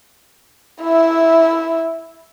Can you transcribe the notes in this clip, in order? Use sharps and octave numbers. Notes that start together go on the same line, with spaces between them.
E4 E5